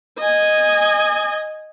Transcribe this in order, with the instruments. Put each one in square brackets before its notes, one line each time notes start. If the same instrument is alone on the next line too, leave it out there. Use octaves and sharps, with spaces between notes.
[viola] D#5 G#5